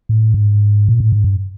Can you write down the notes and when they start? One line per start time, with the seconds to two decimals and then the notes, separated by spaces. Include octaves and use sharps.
0.09 A2
0.34 G#2
0.88 A#2
1.00 A2
1.12 G#2
1.24 G2